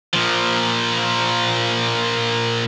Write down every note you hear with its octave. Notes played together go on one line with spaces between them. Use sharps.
A#2 F3